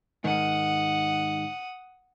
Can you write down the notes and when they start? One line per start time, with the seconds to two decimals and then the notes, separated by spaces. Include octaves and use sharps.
0.24 G#2 D#3 F#5 D#6